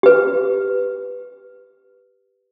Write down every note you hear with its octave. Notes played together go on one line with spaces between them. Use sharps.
G4 B4